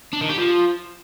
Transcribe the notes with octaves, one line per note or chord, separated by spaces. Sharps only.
D4
D#3
G4
F3